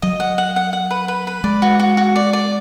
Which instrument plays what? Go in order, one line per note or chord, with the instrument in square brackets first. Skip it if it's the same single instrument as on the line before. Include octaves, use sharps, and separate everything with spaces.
[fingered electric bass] F#3 [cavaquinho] D#5
[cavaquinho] F#5
F#5
F#5
F#5
B4
B4
B4
[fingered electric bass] G#3 [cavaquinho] D5
[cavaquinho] F#4
F#4
F#4
D5
D5